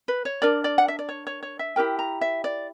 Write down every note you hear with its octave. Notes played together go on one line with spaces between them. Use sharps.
B4
C#5
D4 A#4 D5
D5
F#5
E5
D5
C#5
C#5
C#5
E5
E4 G4 A#4 G5
A#5
E5
D5